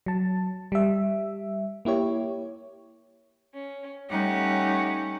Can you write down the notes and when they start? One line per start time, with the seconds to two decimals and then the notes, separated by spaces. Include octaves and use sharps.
0.06 F#3 A5
0.72 G3 E5
1.85 A#3 E4 G4 C#5
3.54 C#4
4.10 G3 A3 C#4 D#4 G4 F#5